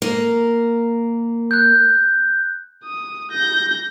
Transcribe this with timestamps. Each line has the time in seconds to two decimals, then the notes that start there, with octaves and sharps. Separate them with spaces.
0.02 A#3
1.51 F#6 G6
2.84 D#6
3.31 G6 A#6